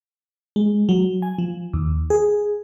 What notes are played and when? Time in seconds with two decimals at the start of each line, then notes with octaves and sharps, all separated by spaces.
0.56 G#3
0.89 F#3
1.22 G#5
1.38 F3
1.74 D#2
2.10 G#4